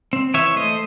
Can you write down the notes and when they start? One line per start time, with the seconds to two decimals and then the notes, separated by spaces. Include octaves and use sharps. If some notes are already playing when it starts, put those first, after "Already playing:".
0.13 C4
0.34 E3 C#5 E5
0.56 A3 C5 D#5